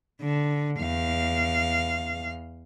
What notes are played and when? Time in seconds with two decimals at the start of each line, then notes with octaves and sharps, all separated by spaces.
0.22 D3
0.81 E2 F5